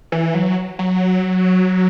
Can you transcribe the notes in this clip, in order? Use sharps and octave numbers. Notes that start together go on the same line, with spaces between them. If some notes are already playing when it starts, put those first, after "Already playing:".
E3
F#3
F#3